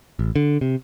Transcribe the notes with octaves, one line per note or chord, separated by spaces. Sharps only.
A1
D3
C3